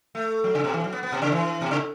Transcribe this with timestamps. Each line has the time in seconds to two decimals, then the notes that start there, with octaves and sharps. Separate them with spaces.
0.15 A3
0.44 F#3
0.55 C#3
0.64 B2
0.74 E3
0.84 F#3
0.93 B3
1.03 B3
1.12 B2
1.22 C#3
1.32 E3
1.61 B2
1.71 C#3